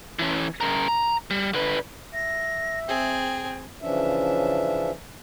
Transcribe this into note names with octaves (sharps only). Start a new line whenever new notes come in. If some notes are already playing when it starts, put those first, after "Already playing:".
E3 C#4
C#3 A#4
A#5
G3
D3 B4
E5 A#6
C4 G#4 G5
C#3 E3 F3 C#4 D4 E5